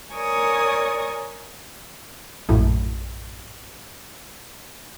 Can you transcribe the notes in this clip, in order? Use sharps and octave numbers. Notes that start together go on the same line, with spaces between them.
A#4 C#5 D5 G#5 C#6 D#6
A#1 F#2 A2